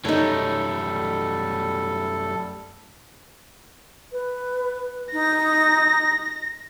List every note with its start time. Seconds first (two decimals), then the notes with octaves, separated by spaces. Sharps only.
0.05 F#2 G3 A3 D#4 A4 C#5
4.12 B4
5.13 D#4 A#6